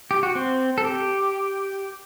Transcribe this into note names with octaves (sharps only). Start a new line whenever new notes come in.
G4
F#4
C4
A4
G4